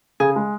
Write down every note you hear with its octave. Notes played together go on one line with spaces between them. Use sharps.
C#3 G#4
G#3